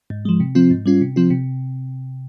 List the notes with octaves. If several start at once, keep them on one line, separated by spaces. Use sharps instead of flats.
G#2
F3 G#3
C3
F3 C4 F4
G#2
G3 C#4 F4
C3
F3 C4 F4
C3